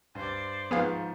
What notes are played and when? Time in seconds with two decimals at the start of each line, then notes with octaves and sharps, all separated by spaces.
0.15 G2 C5 D5
0.71 G#2 D#3 F3 B3 G#4 F5